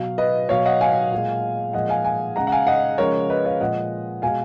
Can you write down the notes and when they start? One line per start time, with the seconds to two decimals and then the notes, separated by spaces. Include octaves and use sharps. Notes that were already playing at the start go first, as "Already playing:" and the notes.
Already playing: B2 F#3 F5
0.18 B4 D#5
0.49 B2 F#3 C#5 F5
0.65 D#5 F#5
0.81 F5 G#5
1.11 A#2 G#3
1.73 A#2 F3 G#3 D#5 F#5
1.89 F5 G#5
2.04 F5 G#5
2.36 C#3 G#3 F#5 A#5
2.47 F#5
2.52 F5 G#5
2.67 D#5 F#5
2.98 C#3 F3 G#3 A#4 C#5
3.30 B4 D#5
3.45 C#5 F5
3.60 A#2 F3 G#3 D#5 F#5
4.22 B2 G#3 F5 G#5